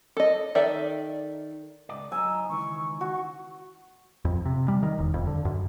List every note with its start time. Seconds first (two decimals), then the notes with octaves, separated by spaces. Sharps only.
0.17 A4 D#5
0.55 D#3 A4 D5 E5
1.89 C#2 D5
2.12 F#3 D#4 G#5 E6
2.49 C#2 D#3 E3 C#6
3.01 F#4 C#6
4.25 F2
4.45 C3
4.68 G3
4.83 D#3
4.99 E1
5.14 F2
5.27 D3
5.45 F#2